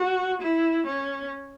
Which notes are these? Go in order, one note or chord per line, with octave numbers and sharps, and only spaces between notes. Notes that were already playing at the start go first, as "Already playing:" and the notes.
Already playing: F#4
E4
C#4